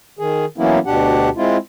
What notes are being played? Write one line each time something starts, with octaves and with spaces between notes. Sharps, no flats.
D#3 G#4
E3 F#3 A#3 B3 C#4 E4
D2 B2 D4 G4 F#5
G#3 C4 E4 F4